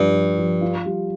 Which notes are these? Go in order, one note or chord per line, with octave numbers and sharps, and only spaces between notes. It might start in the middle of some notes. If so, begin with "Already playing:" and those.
Already playing: G2 F3 D4
F3
F3
F4
G3